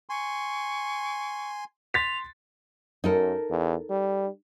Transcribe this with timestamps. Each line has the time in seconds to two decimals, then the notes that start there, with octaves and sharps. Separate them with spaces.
0.09 G#5 C6 C#6
1.94 C6 A6 B6 F7
3.04 F#2 D#4 A4 A#4
3.50 E2
3.90 G3